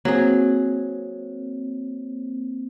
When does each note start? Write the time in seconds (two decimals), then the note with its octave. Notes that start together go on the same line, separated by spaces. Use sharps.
0.05 F#3 A#3 C4 G#4